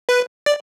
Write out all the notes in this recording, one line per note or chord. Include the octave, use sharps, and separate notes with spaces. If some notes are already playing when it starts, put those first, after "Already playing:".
B4
D5